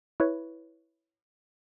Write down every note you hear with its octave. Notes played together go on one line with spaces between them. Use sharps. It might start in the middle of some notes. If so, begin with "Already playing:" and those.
E4 B4 C#5